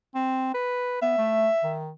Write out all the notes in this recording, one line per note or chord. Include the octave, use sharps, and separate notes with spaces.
C4
B4
B3 E5
A3
D#3